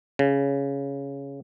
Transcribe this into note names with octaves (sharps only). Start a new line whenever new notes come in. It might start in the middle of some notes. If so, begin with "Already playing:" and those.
C#3